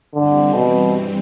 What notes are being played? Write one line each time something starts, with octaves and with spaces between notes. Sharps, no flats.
G2 D3 E3 G3 C4
B2